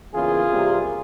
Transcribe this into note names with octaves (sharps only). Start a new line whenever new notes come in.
E2 C#3 E3 A#3 F4 G#4
C3 G3 A#3